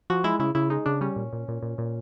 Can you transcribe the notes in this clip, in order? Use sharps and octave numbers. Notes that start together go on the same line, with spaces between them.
F3 F#4
G#3 E4
C#3 E4
C#3 E4
G#3 D#4
C#3 D4
G3 C#4
A#2
A#2
A#2
A#2
A#2